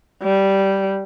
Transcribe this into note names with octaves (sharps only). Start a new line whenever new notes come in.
G3